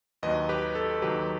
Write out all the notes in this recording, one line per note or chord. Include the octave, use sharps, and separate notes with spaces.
D#2 D#3 F#3 B4 D#5
G4 B4
A4
D#2 D#3 F#3 G4 B4